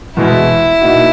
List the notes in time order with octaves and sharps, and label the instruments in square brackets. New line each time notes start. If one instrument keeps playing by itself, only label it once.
[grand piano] E2 B2 G#3 B3 [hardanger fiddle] E4
[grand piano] B2 A#3 D#4 F#4